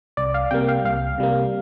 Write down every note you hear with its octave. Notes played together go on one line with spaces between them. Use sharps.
C2 D5
F5
C3 G3 A#3 G5
F5
C2 F5
C3 G3 A#3